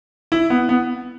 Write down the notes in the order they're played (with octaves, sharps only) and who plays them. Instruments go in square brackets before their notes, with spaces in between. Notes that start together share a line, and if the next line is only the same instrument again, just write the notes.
[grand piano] E4
B3
B3